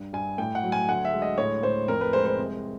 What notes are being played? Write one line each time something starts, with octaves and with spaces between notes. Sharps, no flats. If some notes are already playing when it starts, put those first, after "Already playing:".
Already playing: G2
G2 G#5
A2 G5
F#5
F#3
G#5
D2 F#5
E5
G#3
D#5
A2 C#5
A2 C5
F2 A#4
B4
G#3 C5
C5
C2